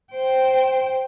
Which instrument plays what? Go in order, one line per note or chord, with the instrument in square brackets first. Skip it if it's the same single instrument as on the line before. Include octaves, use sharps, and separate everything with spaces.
[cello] C5 G5